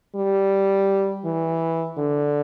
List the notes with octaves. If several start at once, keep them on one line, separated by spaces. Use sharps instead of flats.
G3
E3
D3